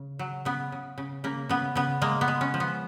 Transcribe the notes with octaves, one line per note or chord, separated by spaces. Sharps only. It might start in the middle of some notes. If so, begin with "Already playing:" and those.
Already playing: C#3
F#3
C#3 B3
C#3
C#3
C#3 A#3
C#3 B3
C#3 B3
G#3 A#3
B3
G#3
C#4
F3
B3